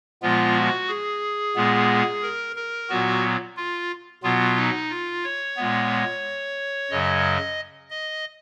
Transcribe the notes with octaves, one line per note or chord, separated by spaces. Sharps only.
A#2 F3 G#3 B3 F4
F#4
G#4
A#2 G#3 B3
A#4
A#4
A#2 F#3 B3 F#4
F4
B2 F#3 B3 F4
D#4
F4
C#5
A#2 G#3 B3
F#2 C#3 F#3 D#5
D#5